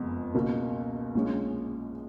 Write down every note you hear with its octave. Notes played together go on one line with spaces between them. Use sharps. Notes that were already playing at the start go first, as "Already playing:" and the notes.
Already playing: F#1 F2 F3 G#3 B3
C#2 B2 A#3
A#1 A#2 G#3 C#4